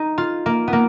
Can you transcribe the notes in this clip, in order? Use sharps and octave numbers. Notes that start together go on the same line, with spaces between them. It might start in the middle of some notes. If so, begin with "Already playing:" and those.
Already playing: D#4
F4
A#3
B3
A#3